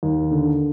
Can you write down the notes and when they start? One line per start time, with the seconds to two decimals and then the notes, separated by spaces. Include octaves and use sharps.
0.03 D#2
0.31 D3